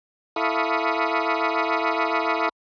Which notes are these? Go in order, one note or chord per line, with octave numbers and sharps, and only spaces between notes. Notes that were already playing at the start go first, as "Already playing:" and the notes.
E4 A4 F5 B5 C#6 D#6